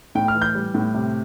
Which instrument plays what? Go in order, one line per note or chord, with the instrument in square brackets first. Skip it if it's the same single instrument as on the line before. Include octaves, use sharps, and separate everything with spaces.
[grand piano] A2 G5
F6
E3
G6
G3
A2
C3